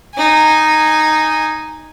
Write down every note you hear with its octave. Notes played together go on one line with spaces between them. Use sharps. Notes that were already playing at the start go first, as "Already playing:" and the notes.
D#4 G#5